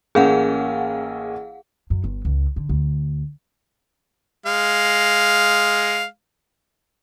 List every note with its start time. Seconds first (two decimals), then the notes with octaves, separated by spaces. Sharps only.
0.15 A1 A#3 C#4 G#4 F5 F#5
1.90 F#2
2.04 G1
2.25 C#2
2.56 D3
2.69 D2
4.46 G#3 F5